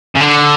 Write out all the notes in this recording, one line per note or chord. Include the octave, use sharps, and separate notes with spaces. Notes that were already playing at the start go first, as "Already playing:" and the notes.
C#3
D3